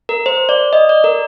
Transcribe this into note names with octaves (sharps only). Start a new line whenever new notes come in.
A#4
C5
D5
D#5
D5
A#4